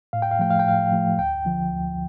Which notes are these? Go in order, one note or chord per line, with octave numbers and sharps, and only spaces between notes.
A2 F5
G5
F5
F3 A3 G5
F5
G5
A2 F5
F3 A3
D2 G5
D3 F3
D2